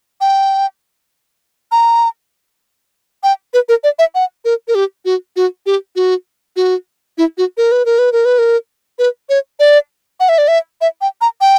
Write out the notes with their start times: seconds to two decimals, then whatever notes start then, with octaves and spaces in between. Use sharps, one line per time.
0.21 G5
1.72 A#5
3.23 G5
3.54 B4
3.69 A#4
3.84 D5
3.99 E5
4.15 F#5
4.45 A#4
4.68 A#4
4.75 G4
5.05 F#4
5.36 F#4
5.66 G4
5.96 F#4
6.56 F#4
7.18 E4
7.38 F#4
7.57 A#4
7.72 B4
7.85 A#4
7.99 B4
8.12 A#4
8.25 B4
8.38 A#4
8.99 B4
9.29 C#5
9.60 D5
10.20 F#5
10.29 E5
10.38 D5
10.48 E5
10.81 E5
11.01 G5
11.21 A#5
11.41 G5